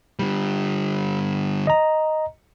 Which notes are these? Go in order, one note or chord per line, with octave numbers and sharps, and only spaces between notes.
D3 G3
D#5 A#5